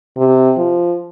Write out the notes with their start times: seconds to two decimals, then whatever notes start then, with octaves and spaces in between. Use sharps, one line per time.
0.17 C3
0.58 F3